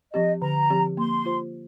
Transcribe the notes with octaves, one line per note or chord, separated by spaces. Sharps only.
F3 C4 G4 D#5
D3 A#5
F3 C4 G4
A#3 C6
F4 C5